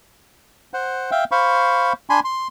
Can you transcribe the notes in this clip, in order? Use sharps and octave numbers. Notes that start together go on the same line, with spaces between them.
C5 F#5
E5 F5 G5
C5 F5 B5 C#6
D4 G#5 B5 C6
C6